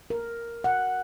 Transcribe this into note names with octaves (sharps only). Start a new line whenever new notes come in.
A#4
F#5